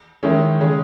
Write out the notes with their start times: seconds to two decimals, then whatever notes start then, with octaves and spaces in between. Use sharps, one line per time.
0.23 D#3 G#3 C#4 E4
0.59 C#3 G#3 C#4 G#4